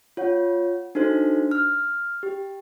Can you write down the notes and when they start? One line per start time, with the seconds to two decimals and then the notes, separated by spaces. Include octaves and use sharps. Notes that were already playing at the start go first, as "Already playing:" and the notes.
0.17 F4 C#5 F#5
0.95 D4 D#4 F#4 A4 C5
1.51 F6
2.23 G4